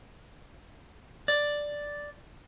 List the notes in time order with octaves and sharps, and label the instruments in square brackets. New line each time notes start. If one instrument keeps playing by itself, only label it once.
[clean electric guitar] D5